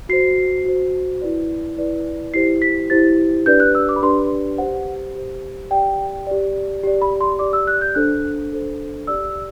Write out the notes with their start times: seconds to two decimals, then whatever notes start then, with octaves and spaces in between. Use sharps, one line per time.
0.09 F#4 C5 C7
0.65 F#4 C5
1.21 E4 B4 D5
1.77 E4 B4 D5
2.34 E4 G4 C5 C7
2.62 B6
2.90 E4 G4 C5 A6
3.46 D4 G4 B4 D5 G6
3.60 F#6
3.75 E6
3.89 D6
3.96 B5
4.02 D4 G4 B4 D5 C6
4.58 G4 C5 F#5
5.15 G4 C5
5.70 G4 D5 G5
6.27 G4 D5
6.83 G4 D5
7.02 B5
7.21 C6
7.39 G4 D5 D6
7.53 E6
7.67 F#6
7.81 G6
7.95 D4 A4 C5 F#6
8.52 D4 A4 C5
9.07 G4 D5 E6